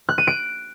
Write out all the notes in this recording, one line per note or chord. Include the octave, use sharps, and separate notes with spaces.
F#6
D#7
D7